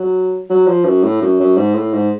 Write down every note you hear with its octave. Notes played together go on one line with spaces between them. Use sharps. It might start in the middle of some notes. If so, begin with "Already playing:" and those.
Already playing: F#3
F#3
F3
F#2
A2
F#2
F#2
G#2
A2
G#2